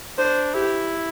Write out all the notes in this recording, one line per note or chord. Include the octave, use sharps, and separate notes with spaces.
D4 C5
E4 G4